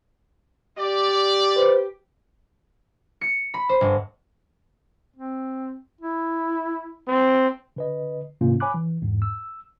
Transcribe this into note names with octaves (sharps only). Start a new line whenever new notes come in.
G4 D5
B4 C5
C#7
B5
C5
G1
C4
E4
C4
D3 B4 D#5
G#2 C3 D#3 A#3 C#4 F4
C#5 G#5 B5 D6 F#6
E3
E2 G#2
E6